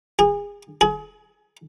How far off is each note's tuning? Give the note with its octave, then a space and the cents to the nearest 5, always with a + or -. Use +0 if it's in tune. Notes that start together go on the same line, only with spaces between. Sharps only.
G#4 -30
G#4 +30